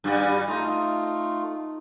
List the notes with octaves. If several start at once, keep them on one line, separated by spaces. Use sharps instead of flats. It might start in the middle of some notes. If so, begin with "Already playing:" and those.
G2 G3 F#4
A3 D#4 F4